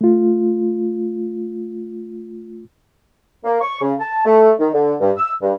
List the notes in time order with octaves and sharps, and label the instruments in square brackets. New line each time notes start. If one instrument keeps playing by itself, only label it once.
[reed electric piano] A3 F4
[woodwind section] A#3
C#6
C#3
A5
A3
D#3
D3
G2
E6
G2